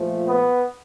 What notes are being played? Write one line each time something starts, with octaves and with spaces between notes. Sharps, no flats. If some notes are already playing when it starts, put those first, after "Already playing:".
Already playing: A#2 F3 A3
B3